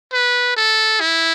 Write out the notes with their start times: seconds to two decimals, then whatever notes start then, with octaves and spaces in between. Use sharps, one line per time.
0.13 B4
0.57 A4
1.01 E4